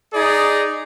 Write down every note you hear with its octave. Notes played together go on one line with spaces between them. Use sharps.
D#4 G#4 D5